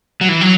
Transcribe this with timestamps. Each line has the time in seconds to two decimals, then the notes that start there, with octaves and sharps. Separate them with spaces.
0.21 F#3
0.29 E3
0.41 F#3